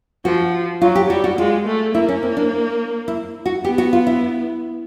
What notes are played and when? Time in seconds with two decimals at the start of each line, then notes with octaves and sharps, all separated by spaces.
0.25 F3 F#4
0.82 F#3 F4
0.95 G4
1.10 G3 F#4
1.24 F#4
1.38 G#3 F4
1.66 A3
1.94 A#3 E4
2.09 C#4
2.23 C4
2.37 D4
3.08 E4
3.46 F#4
3.64 B3 G4
3.78 F#4
3.93 F4
4.07 E4